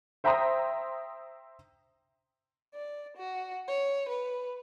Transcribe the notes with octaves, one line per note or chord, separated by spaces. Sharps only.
C5 E5 G5 A#5 C6 D#6
D5
F#4
C#5
B4